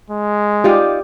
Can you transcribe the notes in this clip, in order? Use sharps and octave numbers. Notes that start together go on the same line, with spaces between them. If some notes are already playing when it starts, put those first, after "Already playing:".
G#3
D#4 F4 G4 D5